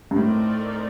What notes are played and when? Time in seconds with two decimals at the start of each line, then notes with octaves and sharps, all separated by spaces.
0.11 G2
0.16 A2 A3 C4 D#4 A#4 D5